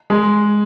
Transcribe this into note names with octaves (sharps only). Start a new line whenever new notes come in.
G#3